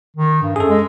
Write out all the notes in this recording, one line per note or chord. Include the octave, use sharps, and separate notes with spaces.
D#3
G2
F#2 G#4 A4
G#3